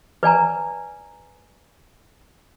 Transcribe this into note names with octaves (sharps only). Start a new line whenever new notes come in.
B4 D5 G#5 A#5